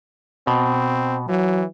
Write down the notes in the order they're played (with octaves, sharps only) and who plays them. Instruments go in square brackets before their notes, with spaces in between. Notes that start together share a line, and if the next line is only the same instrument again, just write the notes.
[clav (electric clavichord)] B2 [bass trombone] C4
[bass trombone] E3 [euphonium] F#3